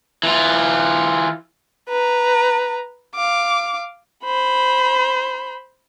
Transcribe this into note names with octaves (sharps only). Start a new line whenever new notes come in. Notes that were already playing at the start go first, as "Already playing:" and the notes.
E3 F4
B4 A#5
F5 D6
C5 B5